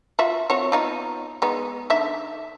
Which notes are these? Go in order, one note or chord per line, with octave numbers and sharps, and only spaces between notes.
F4 F#4 E5
C4 F#4 C#5
B3 D#4 F4
G#3 B3 D#4
D3 D#4 E5